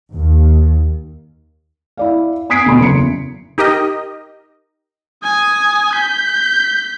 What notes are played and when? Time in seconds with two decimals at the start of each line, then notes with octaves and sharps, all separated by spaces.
0.12 D#2
1.97 E4 D5 F5
2.50 G#5 D#6 G#6 B6 C7 D7
2.66 D2 B2 B5 C6
2.80 F#1 E2 C#7
3.58 D#4 G4 A#4 D#5
5.23 G#5 D#6
5.93 G6 B6